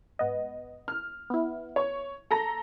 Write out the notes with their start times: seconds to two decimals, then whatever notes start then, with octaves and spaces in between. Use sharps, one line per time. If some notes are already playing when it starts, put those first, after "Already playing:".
0.19 G#2 B3 D#5
0.88 F6
1.30 B3 E4
1.76 C#5 C#6
2.31 A4 A#5 A#6